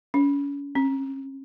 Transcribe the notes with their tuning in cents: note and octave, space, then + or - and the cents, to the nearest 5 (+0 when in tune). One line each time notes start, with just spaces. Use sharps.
C#4 +35
C#4 -40